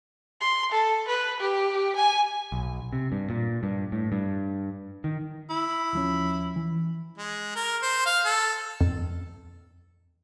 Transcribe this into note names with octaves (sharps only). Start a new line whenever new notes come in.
C6
A4
B4
G4
G#5
B1
C3
G2
A#2
G2
A2
G2
D#3
E4
D#2 F3 C#4
E3
G#3
A#4
C5
F5
A4
F2